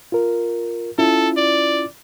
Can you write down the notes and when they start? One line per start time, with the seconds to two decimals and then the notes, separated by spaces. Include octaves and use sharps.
0.12 F4 A#4
0.98 C#4 E4 F4 A4
1.37 D5